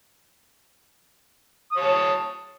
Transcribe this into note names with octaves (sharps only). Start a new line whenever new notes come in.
C#5 A5 D#6